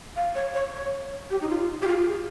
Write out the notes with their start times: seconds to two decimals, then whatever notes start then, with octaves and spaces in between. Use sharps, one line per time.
0.16 F5
0.35 C#5
0.54 C#5
0.73 C#5
1.30 G4
1.41 D#4
1.49 F4
1.82 G4
1.87 F4
2.06 G#4